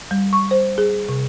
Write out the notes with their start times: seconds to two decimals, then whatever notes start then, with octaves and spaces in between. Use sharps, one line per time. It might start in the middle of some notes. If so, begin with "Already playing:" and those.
0.11 G3
0.33 C#6
0.51 C5
0.78 G#4
1.09 C3